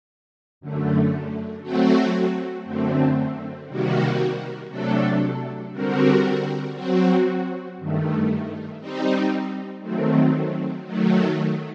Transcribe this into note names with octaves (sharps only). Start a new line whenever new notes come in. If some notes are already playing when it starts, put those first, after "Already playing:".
F#2 D3 A3
F#3 A3 C4 F#4
F#2 D3 A3 C4
C3 D#3 G3 A#3 F#4
C3 F#3 A3 D4 A4
D3 G3 C4 F#4 A#4
F#3 C4 F#4
G2 D#3 A3
G3 C4 D#4
D#3 F#3 A3 C4
D#3 F#3 A3